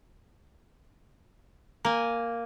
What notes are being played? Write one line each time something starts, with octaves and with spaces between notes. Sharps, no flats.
A#3 G#5